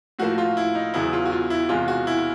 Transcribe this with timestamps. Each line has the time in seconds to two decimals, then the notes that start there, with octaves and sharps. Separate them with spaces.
0.19 A2 F3 A#3 F#4
0.38 F4
0.57 E4
0.75 D#4
0.94 E2 C#3 F#3 B3 E4
1.13 F4
1.26 F#4
1.32 F4
1.50 E4
1.69 E2 C3 E3 G#3 F4
1.88 F#4
2.07 E4